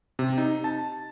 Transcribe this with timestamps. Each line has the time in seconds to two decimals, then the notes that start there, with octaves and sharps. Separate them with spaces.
0.19 C3
0.38 D#4
0.64 A5